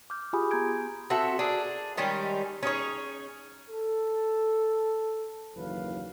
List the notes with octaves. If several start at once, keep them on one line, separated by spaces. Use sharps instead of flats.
D6 F6 G6
F4 G4 G#4 G#5 B5 D#6
B3 A#5 C6 G6 G#6 D7
C4 F#4 A4 E5
D4 G#4 A#4
D#3 G3 G#3 C#4
C#4 D#4 G#4 C#5
A4
F#1 D#2 E3 F#3 B4 F5